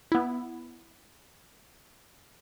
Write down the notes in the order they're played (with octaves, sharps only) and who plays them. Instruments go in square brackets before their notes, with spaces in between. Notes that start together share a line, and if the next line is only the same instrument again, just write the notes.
[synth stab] B3 E4